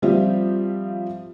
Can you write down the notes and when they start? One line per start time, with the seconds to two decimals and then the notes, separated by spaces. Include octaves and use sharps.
0.02 F3 G3 C4 F4 G4 E5